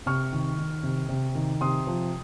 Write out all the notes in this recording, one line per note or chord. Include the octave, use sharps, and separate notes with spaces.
C3 C#6 F6
D#3
D#3
C3
C3
D#3
C3 C6 D#6
F3